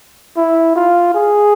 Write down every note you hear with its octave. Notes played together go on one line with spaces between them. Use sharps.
E4
F4
G#4